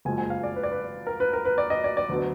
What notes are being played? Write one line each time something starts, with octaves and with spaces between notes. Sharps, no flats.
F#1 F2 F3 G#3 G#5
G#5
F5
D5
B4
D5
B4
A#4
B4
A#4
B4
D5
D#5
D5
D5
D2 D3 F#3 B3